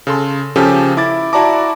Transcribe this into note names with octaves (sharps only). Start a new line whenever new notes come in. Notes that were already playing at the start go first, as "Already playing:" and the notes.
C#3 A4 C6
C#3 F3 C#4 G4 A4
E4 D6 A6
E4 F#4 D5 A5 A#5 D6